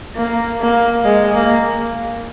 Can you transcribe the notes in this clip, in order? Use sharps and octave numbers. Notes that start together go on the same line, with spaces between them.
A#3
A#3
G#3
A#3